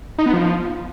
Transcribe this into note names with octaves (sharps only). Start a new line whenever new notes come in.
D#4
B3
F3